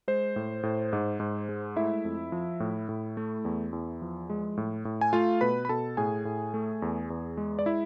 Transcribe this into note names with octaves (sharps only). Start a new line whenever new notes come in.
G#3 C5
A2
A2
G#2
G#2
G#3
A3 E4 E5
F2
F3
A2
A2
A3
E2
E2
F3
G#3
A2
A2
G#5
A3 F4 F5
B2 B4 B5
B5
B2 A4 A5
A2 G#4 G#5
A2
A3
E2
E2
G#3
D5
E4 E5